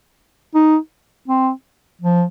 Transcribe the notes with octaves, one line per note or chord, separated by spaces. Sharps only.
D#4
C4
F3